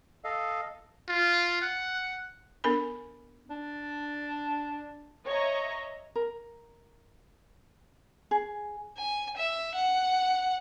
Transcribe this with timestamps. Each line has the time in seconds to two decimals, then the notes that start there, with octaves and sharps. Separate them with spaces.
0.24 A4 D#5 F5
1.08 F4
1.62 F#5
2.64 B3 D4 A4 A#4 G#5 B5
3.50 D4
5.26 C#5 D#5 E5 A#5
6.15 A#4
8.31 G#4
8.97 G#5
9.36 E5
9.74 F#5